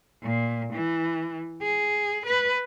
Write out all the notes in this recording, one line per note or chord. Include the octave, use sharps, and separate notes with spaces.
A#2
E3
G#4
B4